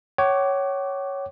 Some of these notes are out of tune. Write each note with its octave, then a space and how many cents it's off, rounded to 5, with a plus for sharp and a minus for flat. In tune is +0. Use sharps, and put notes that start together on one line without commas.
C#5 +0 F#5 +45 D6 +0